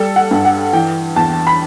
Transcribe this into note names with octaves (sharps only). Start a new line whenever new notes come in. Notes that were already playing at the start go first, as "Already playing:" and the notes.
Already playing: G3 A4
F#5
G2
F#5
E3 G5
E2 A5
B5